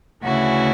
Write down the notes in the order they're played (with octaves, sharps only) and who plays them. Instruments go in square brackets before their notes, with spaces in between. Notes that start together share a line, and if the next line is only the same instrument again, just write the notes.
[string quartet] D2 C#3 E3 E4 F#4